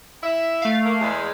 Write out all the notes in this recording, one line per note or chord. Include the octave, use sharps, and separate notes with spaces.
E4 E5
A3 F5
A#3
E2 G#3